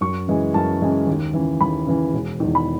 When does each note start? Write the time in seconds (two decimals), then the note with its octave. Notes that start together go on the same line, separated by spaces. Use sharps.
0.01 F#2 C#6
0.28 C#3 E3 G#3
0.54 F#2 A5
0.81 C#3 E3 G#3
1.07 D#2
1.34 C#3 E3
1.61 D#2 B5
1.87 C#3 E3
2.14 E1
2.40 E2 D#3
2.55 B5